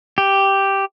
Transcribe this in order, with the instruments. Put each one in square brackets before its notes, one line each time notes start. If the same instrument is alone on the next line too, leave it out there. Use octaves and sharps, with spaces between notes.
[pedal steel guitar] G4